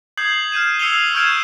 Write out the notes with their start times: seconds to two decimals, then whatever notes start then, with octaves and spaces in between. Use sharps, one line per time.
0.18 D#6 G6 G#6 C7 F#7
0.52 F6 G6 D#7 E7
0.79 E6 C7 C#7 D#7 F7 G7
1.14 C#6 F6 G6 G#6 D7 E7